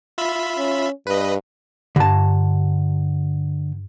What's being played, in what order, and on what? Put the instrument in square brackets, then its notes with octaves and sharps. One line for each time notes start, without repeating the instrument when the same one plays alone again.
[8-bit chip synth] F4 E5 B5
[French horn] C#4
[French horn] G2 [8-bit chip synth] B4 D#5
[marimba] G2 [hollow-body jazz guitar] D3 A5